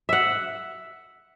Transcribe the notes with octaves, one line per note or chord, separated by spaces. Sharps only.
E5 F#5